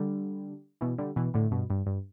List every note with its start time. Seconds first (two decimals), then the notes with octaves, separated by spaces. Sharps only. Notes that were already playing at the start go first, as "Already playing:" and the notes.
Already playing: D3 G3
0.81 B2 E3
0.98 D3 G3
1.16 B2 E3
1.34 A2 D3
1.51 G2 B2
1.70 G2
1.86 G2